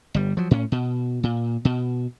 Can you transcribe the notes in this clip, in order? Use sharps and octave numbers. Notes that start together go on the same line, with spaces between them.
G1 G3
F3 F#3
A2 C#4
B2
A#2
B2